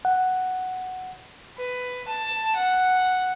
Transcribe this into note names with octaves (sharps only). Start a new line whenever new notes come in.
F#5
B4
A5
F#5